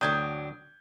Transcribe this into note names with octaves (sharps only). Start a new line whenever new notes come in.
D2 A2 F#3 D4 G5 D#6 G6 G#6